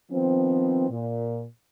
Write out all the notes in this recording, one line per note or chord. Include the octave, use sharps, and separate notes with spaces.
D#3 F3 B3 C4
A#2